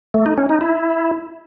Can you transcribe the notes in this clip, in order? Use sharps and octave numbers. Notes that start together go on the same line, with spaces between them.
A3
D#4
C#4
D#4
E4